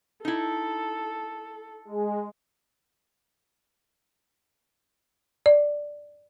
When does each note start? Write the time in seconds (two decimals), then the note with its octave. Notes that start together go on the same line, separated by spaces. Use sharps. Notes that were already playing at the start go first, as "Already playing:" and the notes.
0.25 D#4 E4 A4
1.85 G#3
5.46 D5